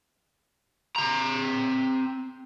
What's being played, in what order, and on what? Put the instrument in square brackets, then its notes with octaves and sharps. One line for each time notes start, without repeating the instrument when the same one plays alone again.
[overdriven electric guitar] C4 A#5